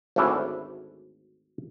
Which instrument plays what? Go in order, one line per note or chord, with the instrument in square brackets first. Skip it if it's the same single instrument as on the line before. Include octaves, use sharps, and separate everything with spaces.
[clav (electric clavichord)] G#1 D2 A3 C#4 D4 E4